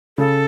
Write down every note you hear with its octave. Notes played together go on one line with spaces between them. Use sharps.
C#3 A4